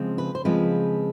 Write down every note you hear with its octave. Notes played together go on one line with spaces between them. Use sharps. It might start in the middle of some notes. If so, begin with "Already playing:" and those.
Already playing: C#3 F3 G#3 C4
B4
C5
C#3 F3 G#3 C4 B4